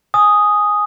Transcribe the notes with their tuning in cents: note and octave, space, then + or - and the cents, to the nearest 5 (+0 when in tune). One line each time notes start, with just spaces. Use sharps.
G#5 +0 D#6 +0